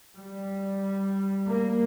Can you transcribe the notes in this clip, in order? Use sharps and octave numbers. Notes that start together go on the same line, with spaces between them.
G3
A#3